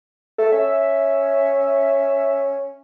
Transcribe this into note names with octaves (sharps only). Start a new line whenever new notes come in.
A3 A4
C#4 E5